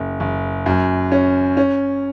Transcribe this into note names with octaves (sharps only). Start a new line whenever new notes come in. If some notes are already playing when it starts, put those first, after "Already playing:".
Already playing: F#1
F#1
F#2
C#4
C#4